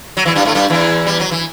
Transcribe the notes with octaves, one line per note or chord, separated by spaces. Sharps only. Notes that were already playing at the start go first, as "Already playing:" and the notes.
F#3
E2 E3
G2 G3
A2 A3
G2 G3
E2 E3
G3
F#3
E3